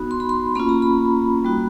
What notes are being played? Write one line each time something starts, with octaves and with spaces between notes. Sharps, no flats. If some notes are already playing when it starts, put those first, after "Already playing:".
Already playing: B3 D#4 F#4 B5
C6
B5
C6
A#3 C#4 F4 B5
A#5
B5
G3 A#3 D#4 F#4